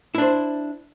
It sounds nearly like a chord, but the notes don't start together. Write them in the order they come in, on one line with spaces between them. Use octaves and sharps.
E4 D4 C5